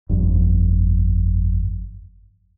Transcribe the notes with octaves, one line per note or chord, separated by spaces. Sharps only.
G1 F2